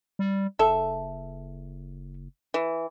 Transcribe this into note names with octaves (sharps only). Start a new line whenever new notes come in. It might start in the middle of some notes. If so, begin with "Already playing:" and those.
G3
F#1 A4 E5
E3